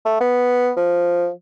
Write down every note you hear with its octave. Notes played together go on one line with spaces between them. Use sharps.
A3
B3
F3